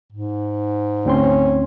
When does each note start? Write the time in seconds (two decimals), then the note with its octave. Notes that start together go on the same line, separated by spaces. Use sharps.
0.12 G#2
1.05 D2 C4 C#4 C6